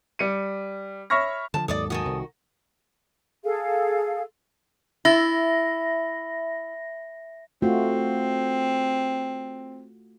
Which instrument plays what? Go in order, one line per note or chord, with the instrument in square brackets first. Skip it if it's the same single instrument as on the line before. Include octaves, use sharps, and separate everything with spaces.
[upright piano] G3 C#7 D#7
C#5 E5 B5 C#6 F6 A#6
[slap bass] D3 D#3 F3 [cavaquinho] A5
[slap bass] D#2 G#2 F#3 [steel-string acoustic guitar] A4 [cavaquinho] D5 D6 D#6
[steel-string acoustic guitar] D#3 F#4 [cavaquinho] A4 G#5 D#6
[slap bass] C2
[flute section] G#4 A4 F5
[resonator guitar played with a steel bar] E4 [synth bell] E5 A#6
[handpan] A3 F4 F#4 [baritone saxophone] C4